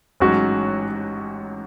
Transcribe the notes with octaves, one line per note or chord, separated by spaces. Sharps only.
A1 G#2 F#3 C#4 F#4